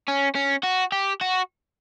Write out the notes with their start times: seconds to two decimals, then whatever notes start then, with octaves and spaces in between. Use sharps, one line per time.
0.08 C#4
0.35 C#4
0.64 F#4
0.92 G4
1.21 F#4